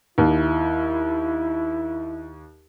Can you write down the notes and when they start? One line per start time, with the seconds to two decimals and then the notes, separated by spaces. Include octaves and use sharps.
0.18 D#2 E4